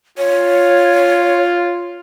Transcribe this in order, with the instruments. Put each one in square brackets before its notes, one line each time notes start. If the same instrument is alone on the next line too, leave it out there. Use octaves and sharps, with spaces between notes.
[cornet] F4 [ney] C#5